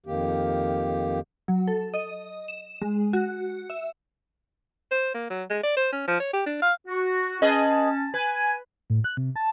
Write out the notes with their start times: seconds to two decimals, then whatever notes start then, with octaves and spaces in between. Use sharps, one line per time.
0.06 F2 D#3 A#3 G4
1.48 F#3
1.68 A4
1.94 D#5
2.48 E7
2.82 G#3
3.13 F#4
3.70 E5
4.91 C5
5.14 A#3
5.30 F#3
5.50 G#3
5.63 D5
5.77 C5
5.92 C#4
6.08 F3
6.20 C#5
6.34 G4
6.46 D4
6.62 F5
6.87 F#4
7.42 C#4 G#4 B4 D#5 A5
8.14 B4 G#5
8.90 A2
9.04 F#6
9.17 C3
9.36 A5